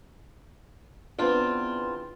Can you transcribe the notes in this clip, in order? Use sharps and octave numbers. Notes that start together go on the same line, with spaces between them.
E2 B3 C4 D4 F4